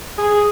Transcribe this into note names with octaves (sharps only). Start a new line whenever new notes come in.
G#4